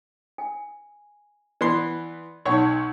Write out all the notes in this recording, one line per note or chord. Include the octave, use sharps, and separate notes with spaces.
G#5
E3 B3 D5 C6
B1 D#4 C#5 F#5 C#6